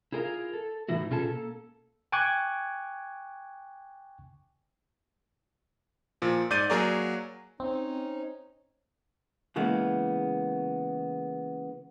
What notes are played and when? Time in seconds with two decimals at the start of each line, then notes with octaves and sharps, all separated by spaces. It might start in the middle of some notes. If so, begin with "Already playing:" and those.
0.12 E4 F4 G#4 A#4 C5 F5
0.53 A4
0.89 A2 E3 D#4 E4 F#4
1.10 B2 C#4 F4 G#4 A4 A5
1.29 A#3 A4
2.12 G5 G#5 C#6 D6 F#6 G#6
6.22 A#2 F3
6.50 G#2 D5 G6 A6 D#7
6.70 F#3 A#3 G#4 A#4 C#5 D5
7.60 C4 C#4 D#4
9.56 C#3 E3 G#3 A#3 B3